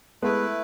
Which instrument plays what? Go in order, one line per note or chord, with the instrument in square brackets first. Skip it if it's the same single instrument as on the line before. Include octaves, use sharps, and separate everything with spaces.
[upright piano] G#3 B3 [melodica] A3 E4 B4